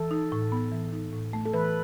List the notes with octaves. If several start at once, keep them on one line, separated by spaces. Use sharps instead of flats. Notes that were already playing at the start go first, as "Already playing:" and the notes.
Already playing: E3 A4
D#4
A2
B3
E3
D#4
A2
A3
A4
E3 B4